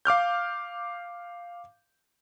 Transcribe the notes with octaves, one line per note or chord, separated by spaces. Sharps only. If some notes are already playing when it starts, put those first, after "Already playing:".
F5 D6 F6 G6